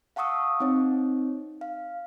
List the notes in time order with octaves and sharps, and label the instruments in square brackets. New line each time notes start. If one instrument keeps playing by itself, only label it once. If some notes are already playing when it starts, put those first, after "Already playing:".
[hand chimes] F5 F#5 A5 C#6 D#6 E6
C4 D#4 C#5
F5